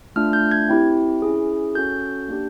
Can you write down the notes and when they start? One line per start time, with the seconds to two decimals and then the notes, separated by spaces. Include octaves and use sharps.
0.16 A3 D4 F4 F6
0.33 G6
0.52 G#6
0.69 C4 E4 G4
1.22 C#4 E4 G#4
1.75 C#4 F#4 A4 G6
2.28 A#3 D4 G4